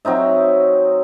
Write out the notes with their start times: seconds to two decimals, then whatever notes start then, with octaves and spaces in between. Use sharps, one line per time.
0.05 F#3 C4 D#4 E5